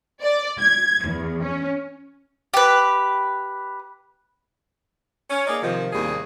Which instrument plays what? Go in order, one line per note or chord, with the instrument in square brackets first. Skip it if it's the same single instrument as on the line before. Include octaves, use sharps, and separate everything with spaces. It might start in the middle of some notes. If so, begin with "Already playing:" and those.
[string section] D5
G#6
E2
C#4
[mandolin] G4 B4
[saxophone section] C#4
A#3 D#4 G#4 D5
C3 D#3 F3
D#2 A2 C3 G3 A#3 G#4